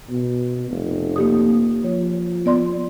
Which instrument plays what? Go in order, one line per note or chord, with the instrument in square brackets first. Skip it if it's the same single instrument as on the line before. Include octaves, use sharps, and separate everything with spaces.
[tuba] B2
F1
[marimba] A#3 G4 D#6
[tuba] F3 [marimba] C#5
[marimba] B3 D5 C6